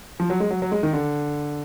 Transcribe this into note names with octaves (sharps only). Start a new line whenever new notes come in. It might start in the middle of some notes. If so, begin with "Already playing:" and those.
F3
F#3
G#3
F#3
F#3
G#3
D#3
D3